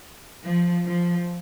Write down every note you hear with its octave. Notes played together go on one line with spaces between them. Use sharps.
F3
F3